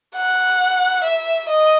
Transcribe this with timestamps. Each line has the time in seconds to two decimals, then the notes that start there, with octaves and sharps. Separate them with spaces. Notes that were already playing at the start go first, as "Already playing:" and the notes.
0.16 F#5
1.04 E5
1.49 D#5